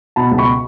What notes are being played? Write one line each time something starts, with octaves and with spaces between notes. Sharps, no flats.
B2 A5 B5
C#2
B5 C#6